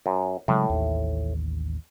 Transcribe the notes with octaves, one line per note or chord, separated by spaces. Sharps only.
F#2
A2 C#3 F#3 G#3
A1 D#2